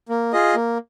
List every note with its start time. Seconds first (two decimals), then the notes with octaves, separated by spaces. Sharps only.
0.09 A#3
0.33 F4 G#4 D#5
0.55 A#3